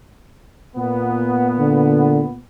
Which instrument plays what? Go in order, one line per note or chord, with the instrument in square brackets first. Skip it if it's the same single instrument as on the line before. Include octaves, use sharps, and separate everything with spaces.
[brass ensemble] A#2 B3
[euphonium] D3